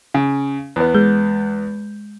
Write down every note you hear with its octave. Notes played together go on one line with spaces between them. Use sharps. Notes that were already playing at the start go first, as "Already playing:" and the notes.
C#3
E2 B3
G#3 G6